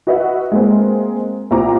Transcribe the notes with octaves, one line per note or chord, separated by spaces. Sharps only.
F#4 B4 D#5 E5 F#5
G#3 A#3 C4
C2 A#2 C4 A#5 D6